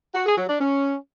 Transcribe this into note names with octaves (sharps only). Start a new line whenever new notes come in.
F#4
G#4
F#3
D4
C#4